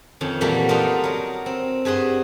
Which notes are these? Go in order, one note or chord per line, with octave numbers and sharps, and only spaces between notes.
F2 D#3 C#4
A#2 E3 G3 A3 A#3 F#4
A3 B3 D4 D#4 F4 A#4
F#3 A#4
C4
G2 G#4 F#5 C6